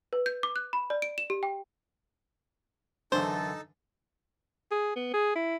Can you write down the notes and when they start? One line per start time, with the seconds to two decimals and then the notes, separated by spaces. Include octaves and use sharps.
0.13 B4
0.26 G6
0.43 D6
0.56 F#6
0.73 B5
0.90 D5
1.02 D7
1.18 E7
1.30 G4
1.43 G5
3.12 F#2 D3 E3 D4 D#4 A4 C5 A5
4.71 G#4
4.96 B3
5.14 G#4
5.36 E4